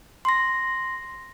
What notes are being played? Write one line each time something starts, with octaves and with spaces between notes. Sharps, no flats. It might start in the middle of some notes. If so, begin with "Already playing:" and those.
C6 A#6